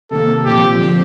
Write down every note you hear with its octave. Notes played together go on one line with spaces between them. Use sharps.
C3 D#3 A#3 A4
A#2 F3 C4 G4
D3 F3 C4 G4